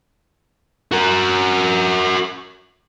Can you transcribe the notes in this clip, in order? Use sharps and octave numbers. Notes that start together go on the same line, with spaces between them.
F#4 A#4